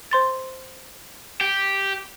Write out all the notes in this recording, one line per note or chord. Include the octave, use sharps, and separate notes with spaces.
C5 C6 A6
G4